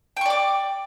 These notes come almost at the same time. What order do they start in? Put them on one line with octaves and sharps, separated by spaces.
G5 C#6 D5 D6